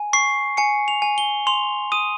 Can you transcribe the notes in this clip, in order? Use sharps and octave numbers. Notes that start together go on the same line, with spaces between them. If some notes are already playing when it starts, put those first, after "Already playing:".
Already playing: G#5
C#6 C7
G#5 C#7
F7
G#5
G7
C6 F7
D#6 D#7